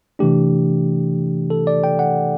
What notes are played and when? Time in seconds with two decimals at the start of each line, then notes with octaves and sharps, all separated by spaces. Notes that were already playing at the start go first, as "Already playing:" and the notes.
0.19 C3 E3 A3 D4 G4
1.50 A4
1.67 D5
1.84 G5
1.99 F#5